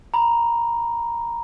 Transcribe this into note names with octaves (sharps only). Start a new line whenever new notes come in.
A#5 B5